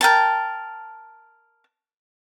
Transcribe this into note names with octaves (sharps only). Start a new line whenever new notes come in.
A#4 G5 A5